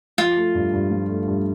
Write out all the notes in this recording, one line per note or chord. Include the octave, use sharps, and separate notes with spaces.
F3 F4
A3
G2
G2
F3
A3
G2